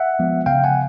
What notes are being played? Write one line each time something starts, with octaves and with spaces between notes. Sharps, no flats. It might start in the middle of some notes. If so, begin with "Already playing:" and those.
Already playing: E5 F#5
F3 G#3 B3
C#3 F5 G5
F#5 G#5